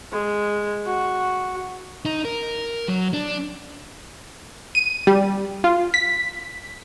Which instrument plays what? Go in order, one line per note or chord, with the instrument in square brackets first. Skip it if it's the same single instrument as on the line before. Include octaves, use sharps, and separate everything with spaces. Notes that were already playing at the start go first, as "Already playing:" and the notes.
[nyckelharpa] G#3
F#4
[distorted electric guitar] D#4
A#4
F#3
D4
[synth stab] D#7
G3
F4
B6